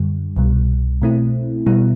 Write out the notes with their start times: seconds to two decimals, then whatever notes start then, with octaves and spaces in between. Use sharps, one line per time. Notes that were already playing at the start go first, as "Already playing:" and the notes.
Already playing: F#2 D3 G3
0.37 C2 B2 G3
1.02 B2 A3 C4 E4
1.66 B2 G3 B3 E4